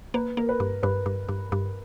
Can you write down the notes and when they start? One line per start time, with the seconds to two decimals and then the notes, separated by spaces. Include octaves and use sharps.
0.14 A#3 B4
0.37 A#3 A#4
0.49 B4
0.60 G2
0.83 G2 B4
1.06 G2
1.29 G2
1.52 G2